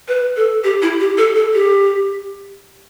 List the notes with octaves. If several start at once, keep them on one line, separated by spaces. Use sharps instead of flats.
B4
A4
G4
E4
G4
A4
A4
G4